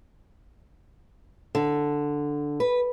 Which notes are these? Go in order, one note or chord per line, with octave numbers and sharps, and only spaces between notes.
D3
B4